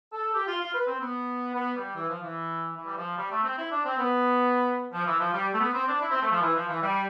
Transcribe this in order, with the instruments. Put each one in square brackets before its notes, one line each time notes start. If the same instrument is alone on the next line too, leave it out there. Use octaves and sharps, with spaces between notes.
[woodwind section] A4
G4
F4
F4
B4
C4
B3
B3
G3
E3
F3
E3
E3
G3
F3
G3
A3
C4
E4
D4
C4
B3
F3
E3
F3
G3
A3
B3
C4
D4
E4
C4
A3
F3
E3
F3
E3
G3